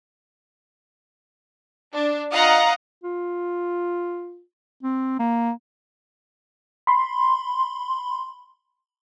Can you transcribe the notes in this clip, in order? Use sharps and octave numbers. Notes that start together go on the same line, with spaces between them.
D4
F4 D#5 F5 F#5 A#5 D#6
F4
C4
A#3
B5 C6